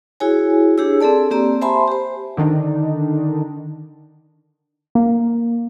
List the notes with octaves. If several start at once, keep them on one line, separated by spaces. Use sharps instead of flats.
E4 F#4 G#4 C#5 G#5
D4 G4 G#4 C#5 E6
C4 G#4 A4 D5 A5
A#3 C4 G4 D5 A#5
C5 E5 G#5 A5 B5 C6
G4 C5
D3 D#3 D4 D#4
A#3